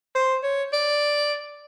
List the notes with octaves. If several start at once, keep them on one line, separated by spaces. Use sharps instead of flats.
C5
C#5
D5